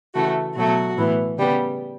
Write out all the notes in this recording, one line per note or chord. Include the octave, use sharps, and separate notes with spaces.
C#3 E3 A3 F#4
B2 F#3 A3 F#4
A2 E3 B3
C#3 G3 B3